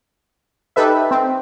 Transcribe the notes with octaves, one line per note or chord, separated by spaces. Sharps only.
D#4 G4 A4 B4 E5
C4